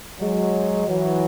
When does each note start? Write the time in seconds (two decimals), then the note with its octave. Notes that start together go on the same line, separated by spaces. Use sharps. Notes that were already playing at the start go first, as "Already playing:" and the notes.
0.19 F#3 G#3
0.87 E3 F#3